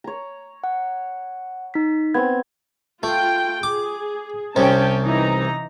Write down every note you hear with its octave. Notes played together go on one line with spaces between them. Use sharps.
C#5 A#5
F#5
D#4 B6
B3 C4 G#6
A3 F4 G5
G#4 D6
C2 C3 C#4 G5 A5
E3 D#4 A#5